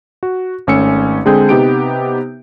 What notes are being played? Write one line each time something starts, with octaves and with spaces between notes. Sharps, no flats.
F#4
G#1 A3 C#4 G#5 E6 C#7
D3 G#3 C4 G#4 G5 G6
C3 B3 D#4 G4 G5 D7